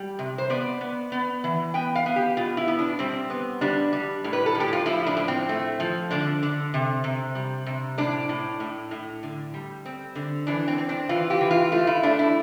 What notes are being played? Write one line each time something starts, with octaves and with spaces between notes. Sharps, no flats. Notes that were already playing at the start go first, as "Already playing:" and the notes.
Already playing: G3
C3
C5
B3 D5
B3
B3
E3
B3 G5
F5
B3
G4
B2 F4
E4
B3
D4
G3 C4
B3
G3 D4
G3
A2
B4
A4
A2
G4
F4
F3 E4
D4
A2
C4
A3
F3
D3 D4
D3
C3
C3
G3
C3
A2 D4
A2
A2
A2
D3
G3
C4
D3
E3 D4
C4
C4
D4
E3 F4
G4
E3
F4
A3 F4
E4
A3 D4
E4